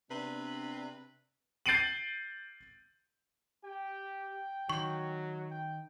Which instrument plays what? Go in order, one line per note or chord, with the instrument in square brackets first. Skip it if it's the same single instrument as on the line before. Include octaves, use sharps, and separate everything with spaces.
[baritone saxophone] C3 [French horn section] B3 D4 [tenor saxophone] B4
[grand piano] G6 A6 C7 D7 D#7 F#7
[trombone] G4 [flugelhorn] G5
[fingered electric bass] D#3 [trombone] F#3 [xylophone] C#6
[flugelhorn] G5